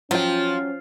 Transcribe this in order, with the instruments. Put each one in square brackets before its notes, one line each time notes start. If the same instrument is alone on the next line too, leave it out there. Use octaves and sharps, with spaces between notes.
[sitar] F3 [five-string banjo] F#3 G5 [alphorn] C#4 [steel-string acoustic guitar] F4